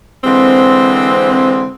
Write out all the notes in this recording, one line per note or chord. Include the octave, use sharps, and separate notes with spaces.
D3 E3 G#3 C4